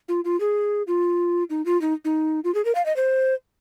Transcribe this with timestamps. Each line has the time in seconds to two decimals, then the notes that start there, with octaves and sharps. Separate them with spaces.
0.08 F4
0.25 F4
0.40 G#4
0.87 F4
1.50 D#4
1.66 F4
1.81 D#4
2.05 D#4
2.44 F4
2.55 G#4
2.65 A#4
2.75 F5
2.86 D#5
2.96 C5